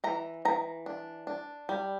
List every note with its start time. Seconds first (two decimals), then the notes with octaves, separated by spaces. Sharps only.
0.04 E3 A#5
0.45 E3 A#5
0.86 D4
1.27 D4
1.69 G3